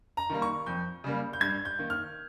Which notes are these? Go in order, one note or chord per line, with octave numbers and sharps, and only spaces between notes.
A#5
D#3 G3 A#3
C#6
F2 G6
C#3 G3 A#3
G6
G2 G#6
G6
D#3 A#3
F6